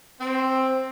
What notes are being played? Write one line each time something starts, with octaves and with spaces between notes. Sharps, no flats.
C4